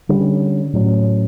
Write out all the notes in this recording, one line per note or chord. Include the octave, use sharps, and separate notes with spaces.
D3 G3 C#4
A2 F#3 C#4